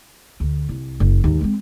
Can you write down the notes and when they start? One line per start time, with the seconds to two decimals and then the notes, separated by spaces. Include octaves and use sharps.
0.40 D2
0.69 C2
1.00 F#1
1.24 D#2 G#2
1.41 G#3 C4